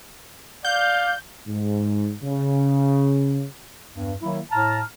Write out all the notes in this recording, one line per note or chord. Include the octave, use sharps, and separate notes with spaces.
D5 F5 G6
G#2
C#3
E2 G2
D#3 F#3 A#3 E4
A2 A5 A#5 F6